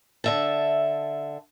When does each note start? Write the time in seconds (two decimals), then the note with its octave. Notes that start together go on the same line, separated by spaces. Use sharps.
0.24 D3 E5 A5